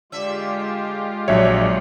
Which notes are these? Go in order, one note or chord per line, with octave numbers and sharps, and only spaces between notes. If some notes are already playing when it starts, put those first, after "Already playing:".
D3 G#3 F4 G4 E5
A#1 D3 F#3 C#5 E5